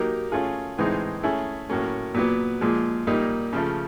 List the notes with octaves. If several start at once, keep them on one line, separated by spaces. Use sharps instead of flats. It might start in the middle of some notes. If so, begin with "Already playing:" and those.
Already playing: F#3 A#3 D#4 G4 A#4
A3 C#4 F4 G#4
A2 E3 G#3 C4 D#4
A3 C#4 E4 G#4
A2 F#3 A#3 C#4
A#2 F#3 B3
A#2 F3 G#3
A#2 G3 A#3 D#4
C#3 F3 A3